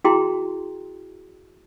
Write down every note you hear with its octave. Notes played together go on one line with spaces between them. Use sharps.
E4 F#4 G#4 G5 A#5 C6